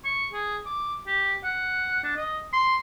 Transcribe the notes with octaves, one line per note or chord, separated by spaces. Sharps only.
C#6
G#4
D6
G4
F#5
D4
D#5
C6